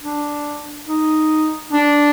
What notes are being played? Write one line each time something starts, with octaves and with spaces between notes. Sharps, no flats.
D4
D#4
D4